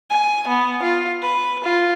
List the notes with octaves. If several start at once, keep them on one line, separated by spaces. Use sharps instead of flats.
G#5
B3
F4
B4
F4